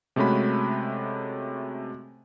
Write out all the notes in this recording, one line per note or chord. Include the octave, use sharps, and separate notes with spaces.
C3 G#3 A3 C#4 F#4 B5